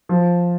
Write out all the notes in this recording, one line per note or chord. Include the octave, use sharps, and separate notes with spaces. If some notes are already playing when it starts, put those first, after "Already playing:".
F3